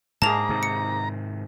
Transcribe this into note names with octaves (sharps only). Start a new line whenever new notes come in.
G#2 A#3 G#4 A5 A#5 F7
G#2 C3 D#3
C#7